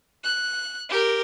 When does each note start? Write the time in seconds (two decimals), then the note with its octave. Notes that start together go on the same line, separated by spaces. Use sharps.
0.24 F#6
0.90 G4 A#4